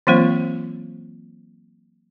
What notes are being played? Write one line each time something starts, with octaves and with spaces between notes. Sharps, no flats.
E3 F#3 A#3 C4 F4 C5